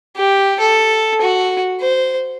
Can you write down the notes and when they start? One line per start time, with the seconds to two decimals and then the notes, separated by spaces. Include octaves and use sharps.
0.17 G4
0.60 A4
1.21 F#4
1.80 C5